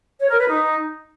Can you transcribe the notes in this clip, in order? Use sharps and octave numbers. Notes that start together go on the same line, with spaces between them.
C#5
A#4
B4
D#4